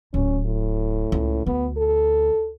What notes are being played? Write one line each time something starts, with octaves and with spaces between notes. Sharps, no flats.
D1 C#4
A2
C#2
D2 B3
A4